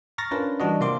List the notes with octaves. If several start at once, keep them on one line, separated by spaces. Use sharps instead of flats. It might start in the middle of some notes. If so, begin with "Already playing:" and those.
A#5 C#6 F6 A6 A#6
C#4 D4 F4 A#4 B4
E3 G3 D4 F#4 D#5
C3 A#3 C4 F4 C6 D6